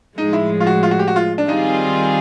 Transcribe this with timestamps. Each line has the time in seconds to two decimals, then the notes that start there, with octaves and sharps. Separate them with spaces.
0.17 A2 F3 G#3 D#4
0.33 E4
0.60 F4
0.67 F#4
0.83 F4
0.91 F#4
0.99 G4
1.08 F#4
1.16 F4
1.38 D4
1.48 D#3 G3 C4 D#4 F4 G#4